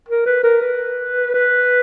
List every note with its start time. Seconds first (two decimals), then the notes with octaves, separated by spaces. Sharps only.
0.08 A#4
0.26 B4
0.43 A#4
0.62 B4
1.34 B4